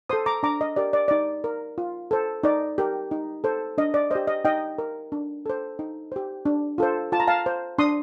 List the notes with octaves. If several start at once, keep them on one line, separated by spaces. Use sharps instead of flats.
A4 C5 C6 D#6
A#5 D6
D4 A#5 D6
D#5
G4 A#4 D5
D5
D#4 D5
A#4
F4
A4 C5
D#4 D5
G4 A#4
D#4
A4 C5
D4 D#5
D5
G4 C5 D#5
D#5
D#4 D#5 G5
A#4
D4
A4 C5
D#4
G4 C5
D4
F4 A4 C5
F4 A5
A#5
F5 A5
C5
D4 C6 D#6